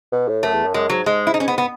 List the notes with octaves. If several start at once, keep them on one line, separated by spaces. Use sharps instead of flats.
B2
A2
F#2 A3
E2
F#2
F#2 G#3
G#2 F#3
G#2 G#3
E4
D#4
C#4
B3
B3